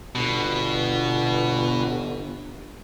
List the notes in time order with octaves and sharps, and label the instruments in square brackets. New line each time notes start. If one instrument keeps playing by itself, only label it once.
[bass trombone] G1 [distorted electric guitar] B2